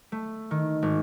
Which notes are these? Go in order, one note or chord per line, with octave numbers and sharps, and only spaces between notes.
A3
D#3
G#1